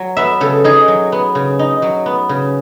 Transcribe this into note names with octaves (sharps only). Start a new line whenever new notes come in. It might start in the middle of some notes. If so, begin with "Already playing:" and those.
Already playing: F#3
B3 E5
C#3 A4
D#4 G#4
F#3
B3
C#3
D#4
F#3
B3
C#3